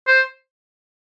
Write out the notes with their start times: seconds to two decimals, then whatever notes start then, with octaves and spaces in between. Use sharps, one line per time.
0.07 C5